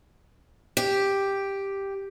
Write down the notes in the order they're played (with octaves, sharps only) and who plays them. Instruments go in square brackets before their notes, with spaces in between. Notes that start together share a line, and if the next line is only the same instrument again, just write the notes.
[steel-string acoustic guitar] G4